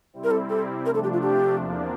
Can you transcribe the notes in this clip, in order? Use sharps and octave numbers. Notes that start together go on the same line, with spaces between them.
C3 G3 C4 E4
A#4
A4
A4
C3 F3 A3 D4 A#4
A4
G4
F4
G4
E2 C3 F3 A#3 D4